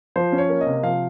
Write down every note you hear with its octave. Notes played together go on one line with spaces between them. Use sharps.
F3 C5
C#4
C#5
A#3
D#5
C3
F3 F5